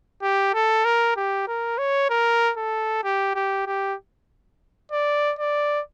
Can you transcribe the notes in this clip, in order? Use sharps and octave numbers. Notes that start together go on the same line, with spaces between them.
G4
A4
A#4
G4
A#4
C#5
A#4
A4
G4
G4
G4
D5
D5